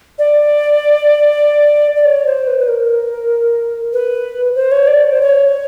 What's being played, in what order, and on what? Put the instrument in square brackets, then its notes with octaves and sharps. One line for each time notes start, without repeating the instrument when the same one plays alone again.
[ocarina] D5
D5
C#5
C5
B4
B4
A#4
B4
C5
C#5
D5
C#5
C5
C#5